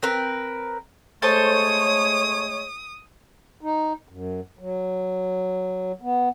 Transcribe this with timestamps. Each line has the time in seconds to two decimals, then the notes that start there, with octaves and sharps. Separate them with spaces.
0.02 C4 A#4 B4
1.22 G#3 A3 A4 C5 C#5 A5 D#6
3.61 D#4
4.09 F#2
4.59 F#3
6.02 B3